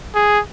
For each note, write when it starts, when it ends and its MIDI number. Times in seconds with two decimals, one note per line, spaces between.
0.15 0.39 68